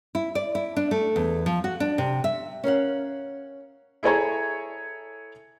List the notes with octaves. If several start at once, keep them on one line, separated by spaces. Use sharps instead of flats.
E4
D5
E4
D4
A3
E2
F3
F#4
D4
C3
E5
C#4 A#4 F5 F#5
E4 G#4 A4 C#5 G#5 A#5